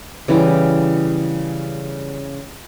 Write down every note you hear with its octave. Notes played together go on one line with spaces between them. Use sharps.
C#3 E3 G3